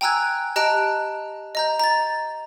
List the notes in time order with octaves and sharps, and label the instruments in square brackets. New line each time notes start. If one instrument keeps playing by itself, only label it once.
[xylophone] G5 G#5 A#5 E6 F#6 G#6
G4 D#5 A5 A#5 F#6 D7
D#5 A#5 G6
A#5 A6